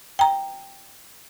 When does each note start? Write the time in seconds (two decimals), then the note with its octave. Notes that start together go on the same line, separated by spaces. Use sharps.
0.19 G5 A#5